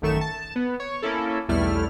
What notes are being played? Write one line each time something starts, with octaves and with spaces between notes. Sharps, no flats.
A1 F#2 D#3 A3 C#6 E7
A5
B3
C#5
A#3 C#4 E4 A4
B1 E2 G3 A3 E4 F6